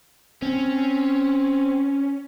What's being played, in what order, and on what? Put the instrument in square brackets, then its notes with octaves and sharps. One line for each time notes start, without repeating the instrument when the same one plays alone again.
[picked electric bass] C4 [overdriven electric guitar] C#4